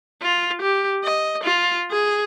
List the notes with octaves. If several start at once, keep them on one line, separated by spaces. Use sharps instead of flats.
F4
G4
D#5
F4
G#4